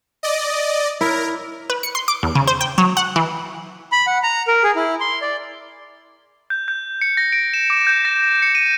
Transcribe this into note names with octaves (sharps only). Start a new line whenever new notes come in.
D5 D#5
E4 A#4
B4
C#7
C6
D6
E2
C#3
C5
G5
F#3
F#5
E3
B5
F#5
A#5
A#4
G#4
E4
C6
D5
G6
G6
C#7
A#6
D7
E7
D6
G6
A#6
C#7
D#7